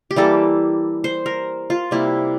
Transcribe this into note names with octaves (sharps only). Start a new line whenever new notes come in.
G4
E3 G3 A#3 A4
C5
A#4
F4
C3 G3 A#3 E4